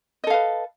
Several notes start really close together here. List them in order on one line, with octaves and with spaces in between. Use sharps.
D#5 A4 F5 B4